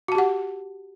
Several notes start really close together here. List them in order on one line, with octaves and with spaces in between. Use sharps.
F#4 A5 G4 F#5